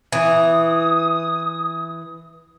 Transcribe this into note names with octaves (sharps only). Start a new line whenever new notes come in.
E3 D#6